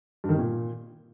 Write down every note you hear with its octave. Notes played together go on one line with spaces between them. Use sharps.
G2
D#3
C3
A#2